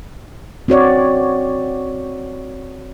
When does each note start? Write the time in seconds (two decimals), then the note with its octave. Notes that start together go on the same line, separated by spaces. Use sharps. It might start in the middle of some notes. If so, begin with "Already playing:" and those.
0.68 C4 F#4 C#5 D5